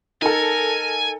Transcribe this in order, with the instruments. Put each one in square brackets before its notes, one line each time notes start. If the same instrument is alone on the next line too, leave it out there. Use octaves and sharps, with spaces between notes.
[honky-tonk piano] D#4 A4 [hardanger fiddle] A#4 [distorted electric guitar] G#5